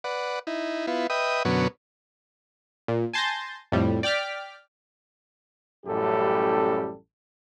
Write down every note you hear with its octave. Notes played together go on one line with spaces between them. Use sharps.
B4 D5 F#5
D#4 E4
B3 E4 F4
B4 D#5 E5 G5 D#6
F#2 B2 D3 F#3 B3 C#4
A#2
G#5 A5 C6 G6 A6 A#6
F2 A2 G3
D5 G5 D6 F6 B6
A1 F#2 A2 G3 G4 A4